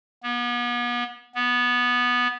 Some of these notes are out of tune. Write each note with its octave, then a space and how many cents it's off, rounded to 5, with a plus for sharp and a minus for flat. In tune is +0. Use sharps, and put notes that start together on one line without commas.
B3 -35
B3 -10